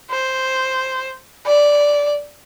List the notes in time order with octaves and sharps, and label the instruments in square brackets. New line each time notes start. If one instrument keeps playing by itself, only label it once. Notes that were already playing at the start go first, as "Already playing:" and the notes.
[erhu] C5
D5